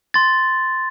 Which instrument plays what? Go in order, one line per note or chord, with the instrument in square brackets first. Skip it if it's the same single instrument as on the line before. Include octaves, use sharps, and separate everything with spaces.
[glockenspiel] C6 A6